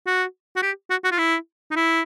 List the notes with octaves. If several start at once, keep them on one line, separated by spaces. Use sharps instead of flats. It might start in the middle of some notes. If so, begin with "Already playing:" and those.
F#4
F#4
G4
F#4
F#4
F4
E4
D#4
E4